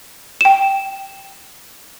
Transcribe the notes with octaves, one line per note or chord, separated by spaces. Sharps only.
G5 E7